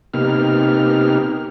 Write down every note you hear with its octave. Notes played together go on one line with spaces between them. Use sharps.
C3 A#3 B3 D#4 G4 F6